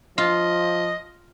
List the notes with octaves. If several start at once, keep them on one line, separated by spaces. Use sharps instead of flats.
F3 F4 D#5